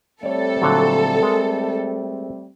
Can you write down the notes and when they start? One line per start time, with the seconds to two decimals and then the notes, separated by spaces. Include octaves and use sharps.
0.23 G3 A3 C4 A4 C#5 D5
0.61 A#2 D3 F#3
1.23 G#3 A#4